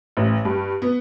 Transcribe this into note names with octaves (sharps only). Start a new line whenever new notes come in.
A1
G2
B3